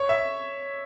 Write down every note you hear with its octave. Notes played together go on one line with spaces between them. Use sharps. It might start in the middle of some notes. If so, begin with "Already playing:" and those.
Already playing: C#5
E5